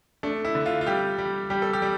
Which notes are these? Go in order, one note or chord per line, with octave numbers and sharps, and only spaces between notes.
A3 D4
E4
D3
F4
F4
G3 G4
G3
G3 G4
A4
G4
G3